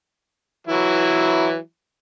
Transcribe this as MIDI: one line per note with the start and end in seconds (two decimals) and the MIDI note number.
0.67 1.58 52
0.67 1.58 54
0.67 1.58 64